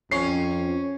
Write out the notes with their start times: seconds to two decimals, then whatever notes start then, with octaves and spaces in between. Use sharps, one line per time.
0.11 F2 C#4 C#6 C7